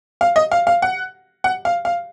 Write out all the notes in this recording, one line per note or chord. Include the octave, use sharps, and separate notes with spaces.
F5
D#5
F5
F5
F#5
F#5
F5
F5